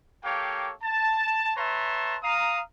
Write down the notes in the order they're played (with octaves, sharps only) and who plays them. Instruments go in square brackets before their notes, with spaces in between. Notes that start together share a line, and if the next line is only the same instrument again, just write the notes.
[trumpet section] A#3 G4 A4 C#5 F5 G5
A5
B4 C#5 E5 A5 A#5 C6
F5 A#5 D#6